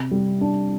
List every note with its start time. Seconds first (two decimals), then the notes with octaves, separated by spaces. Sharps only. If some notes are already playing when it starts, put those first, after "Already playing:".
Already playing: C3
0.11 G3
0.41 D4